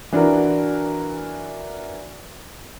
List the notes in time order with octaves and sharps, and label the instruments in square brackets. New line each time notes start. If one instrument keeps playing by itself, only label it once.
[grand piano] E3 D4 F#4 A#4